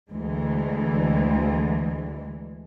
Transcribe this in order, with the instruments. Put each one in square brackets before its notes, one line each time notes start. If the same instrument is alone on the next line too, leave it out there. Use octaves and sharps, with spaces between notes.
[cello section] D2 E3 G#3